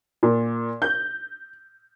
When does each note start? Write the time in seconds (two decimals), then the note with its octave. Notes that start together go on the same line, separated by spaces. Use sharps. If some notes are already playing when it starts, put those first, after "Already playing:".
0.23 A#2
0.82 G6